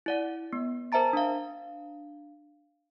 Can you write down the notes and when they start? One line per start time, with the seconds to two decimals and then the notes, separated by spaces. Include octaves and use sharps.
0.06 E4 D5 F#5
0.53 B3
0.92 A#4 C5 E5 A5 A#5 A6
1.13 D4 F5